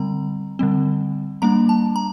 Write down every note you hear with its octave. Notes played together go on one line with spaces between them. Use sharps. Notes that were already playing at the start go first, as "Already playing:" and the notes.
Already playing: D3 G3 C4 A#5
D3 G3 C4
G3 A#3 D4 A#5
A5
A#5